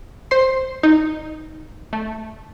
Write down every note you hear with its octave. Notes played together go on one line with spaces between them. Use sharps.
C5 C6
D#4
A3